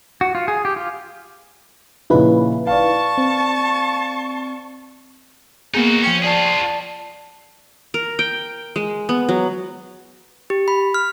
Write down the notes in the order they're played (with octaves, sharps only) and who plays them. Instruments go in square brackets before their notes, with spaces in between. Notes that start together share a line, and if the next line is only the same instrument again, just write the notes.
[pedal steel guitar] F#4
F4
G#4
G4
F4
[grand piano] A#2 C#3 F3 [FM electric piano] D#4 E4 B4
[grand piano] D5 F5 [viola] A5 C#6
[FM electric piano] C4
[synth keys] A#3 B3 G#4 [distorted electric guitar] D#4 F#4
[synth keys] F3 G5 C#6 [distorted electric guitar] C#4
[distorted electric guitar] F4 G#4 [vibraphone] D5 A5
[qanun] A#4
G5
G#3
B3
F#3
[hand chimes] G4
B5
F6